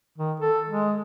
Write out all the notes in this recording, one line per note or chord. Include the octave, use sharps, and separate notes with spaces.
D#3
A4
G#3